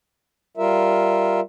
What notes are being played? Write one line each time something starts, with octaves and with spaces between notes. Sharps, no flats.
G3 F4 A#4 E5